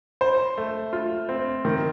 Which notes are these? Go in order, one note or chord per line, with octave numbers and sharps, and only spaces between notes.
C5
A3
F4
C4
D#3